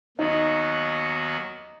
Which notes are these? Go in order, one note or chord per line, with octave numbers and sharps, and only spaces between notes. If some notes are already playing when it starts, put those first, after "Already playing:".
D#2 D#3 F#3 B3 D#4 F#4